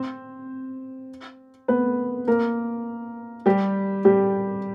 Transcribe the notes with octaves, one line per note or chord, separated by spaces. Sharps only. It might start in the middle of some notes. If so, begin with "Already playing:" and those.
Already playing: C4 C5
B3 B4
A#3 A#4
G3 G4
G3 G4